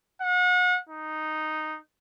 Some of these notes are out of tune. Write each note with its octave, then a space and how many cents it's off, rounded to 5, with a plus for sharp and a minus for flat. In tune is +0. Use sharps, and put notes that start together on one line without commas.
F#5 -35
D#4 -5